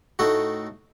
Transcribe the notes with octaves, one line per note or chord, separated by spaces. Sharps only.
A2 A3 D#4 F#4